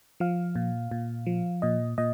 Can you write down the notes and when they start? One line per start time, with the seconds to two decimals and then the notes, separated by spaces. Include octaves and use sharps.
0.20 F3 F5
0.55 A#2
0.91 A#2
1.26 F3
1.62 A#2 D#5
1.98 A#2 D#5